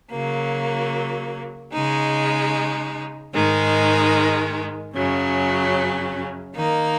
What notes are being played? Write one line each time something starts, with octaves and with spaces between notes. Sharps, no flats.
C#3 F#3 A#3
C#3 G#3 D#4
G#2 D#3 G#3 D#4
F#2 C#3 F#3 C#4
D#3 A#3 D#4